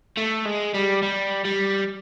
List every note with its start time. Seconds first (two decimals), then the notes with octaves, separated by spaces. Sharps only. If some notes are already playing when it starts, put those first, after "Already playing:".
0.17 A3
0.46 G#3
0.74 G3
1.03 G3
1.45 G3